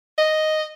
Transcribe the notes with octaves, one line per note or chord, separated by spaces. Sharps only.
D#5